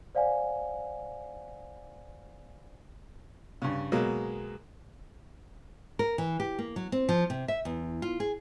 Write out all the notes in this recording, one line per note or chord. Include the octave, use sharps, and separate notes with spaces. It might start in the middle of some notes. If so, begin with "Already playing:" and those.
C5 D5 F5 F#5 G#5
G2 C#3
B2 F#3 G#3 A#3
A#4
E3
G4
A#3
F#3
C4
F3
C3
E5
E2
F4
G#4